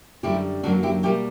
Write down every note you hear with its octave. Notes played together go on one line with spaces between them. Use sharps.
F#2 D3 G3 E4 G4
F#2 D3 F#3 A#3 D4 F#4
E4 G4
B2 G3 A#3 E4 G4